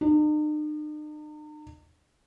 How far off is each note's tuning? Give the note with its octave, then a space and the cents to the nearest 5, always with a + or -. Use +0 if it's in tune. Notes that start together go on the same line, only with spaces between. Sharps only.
D#4 -45